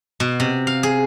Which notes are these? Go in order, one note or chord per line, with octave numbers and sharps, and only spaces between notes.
B2
C3
F5
G#4